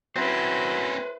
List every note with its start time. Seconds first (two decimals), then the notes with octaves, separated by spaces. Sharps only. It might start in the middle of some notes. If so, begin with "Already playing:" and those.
0.16 F#3 C4 C#4 E4 B4 C5 G5